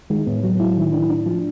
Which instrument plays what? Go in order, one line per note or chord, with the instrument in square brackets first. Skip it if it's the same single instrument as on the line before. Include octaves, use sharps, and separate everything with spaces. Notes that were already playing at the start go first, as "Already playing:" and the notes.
[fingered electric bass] D#3 [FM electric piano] G#3
[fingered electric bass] A2 [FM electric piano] B3
[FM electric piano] F#3
E4
D#3
D4
D4
F3